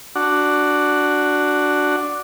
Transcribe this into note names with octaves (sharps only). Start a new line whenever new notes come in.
D4 F#4